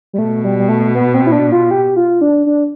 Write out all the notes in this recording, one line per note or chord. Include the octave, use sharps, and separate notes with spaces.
G3
B2 A3
G3
G3
A3
B3
C4
E4
D4
F4
G4
F4
D4
D4